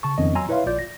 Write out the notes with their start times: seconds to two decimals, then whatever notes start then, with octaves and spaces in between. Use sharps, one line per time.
0.03 C#3 A5 C#6
0.18 F2 D#3 B3 C#4 D#5
0.35 F#3 G#5 A#5 C6 E6
0.49 E4 B4 C#5 E5 F5 C6
0.66 A#1 F4 D5 G6
0.79 A#6